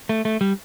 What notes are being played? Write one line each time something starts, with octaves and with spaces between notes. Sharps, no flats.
A3
A3
G3